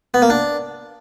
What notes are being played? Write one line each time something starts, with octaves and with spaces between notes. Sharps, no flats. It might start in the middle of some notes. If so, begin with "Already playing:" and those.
B3
A#3
D4